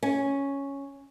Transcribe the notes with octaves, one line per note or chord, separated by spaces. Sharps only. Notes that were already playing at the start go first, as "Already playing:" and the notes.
C#4